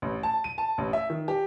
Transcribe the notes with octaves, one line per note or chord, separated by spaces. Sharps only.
A1
A5
D#7
A5
A1
E5
D#3
G4